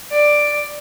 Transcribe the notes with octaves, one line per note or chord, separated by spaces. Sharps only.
D5